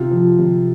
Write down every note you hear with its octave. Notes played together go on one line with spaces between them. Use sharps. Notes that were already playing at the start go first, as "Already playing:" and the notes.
Already playing: C3 F4
F3
C3